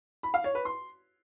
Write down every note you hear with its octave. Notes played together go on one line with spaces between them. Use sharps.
B5
F5
C#5
B4
C6